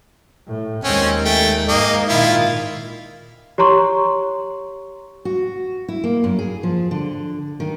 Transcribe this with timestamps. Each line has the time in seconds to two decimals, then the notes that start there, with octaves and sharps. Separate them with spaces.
0.48 A2
0.84 D#2 G#3 C4 C#4
1.25 A3 G5
1.68 G#2 G#3 A#3 D#5
2.09 A#2 D#3 E4 F4
3.58 G4 C#5 A#5 C6 C#6
5.25 F#4
5.88 E4
6.04 A#3
6.24 F#2
6.39 G#4
6.63 F3
6.91 D3
7.60 D#3